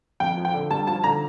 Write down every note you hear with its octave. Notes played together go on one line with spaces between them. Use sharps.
F2 G5
F3
G5
D3
G2 A5
F3 A5
D3 A#5